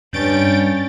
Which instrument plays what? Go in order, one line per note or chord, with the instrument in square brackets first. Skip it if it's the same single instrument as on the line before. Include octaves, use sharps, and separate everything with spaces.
[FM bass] G2 [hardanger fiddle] C#4 [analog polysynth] G6 A6 D7